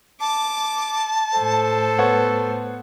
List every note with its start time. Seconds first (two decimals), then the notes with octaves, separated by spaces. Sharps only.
0.20 A5 D6
1.35 A2 A4 C5
1.98 B3 C#5 F#5